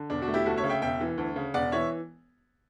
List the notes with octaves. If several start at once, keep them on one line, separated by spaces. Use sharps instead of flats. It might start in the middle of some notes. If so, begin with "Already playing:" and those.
Already playing: D3
E1 D4
D4 F#4
A3
E4 G4
D2 F#4 A4
C#5 E5
C#3
E5 G5
E1 E5 G5
E3
D2
C#3
E1 D5 F#5
E3 C#5 E5